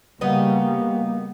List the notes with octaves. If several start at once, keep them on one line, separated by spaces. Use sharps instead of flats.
C#3 G3 A#3 B3 D#4 F#4